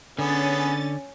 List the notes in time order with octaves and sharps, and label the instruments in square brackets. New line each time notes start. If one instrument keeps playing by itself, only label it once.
[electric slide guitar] D3 [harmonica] B3 G#4 [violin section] C#4 A6